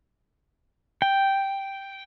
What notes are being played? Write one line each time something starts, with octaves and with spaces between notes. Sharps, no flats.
G5